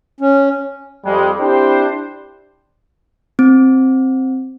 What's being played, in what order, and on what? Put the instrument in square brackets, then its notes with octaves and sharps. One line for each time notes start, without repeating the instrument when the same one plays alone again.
[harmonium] C#4
[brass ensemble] F2 G3 G#3
C4 D4 E4 G4 C5
[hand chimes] C4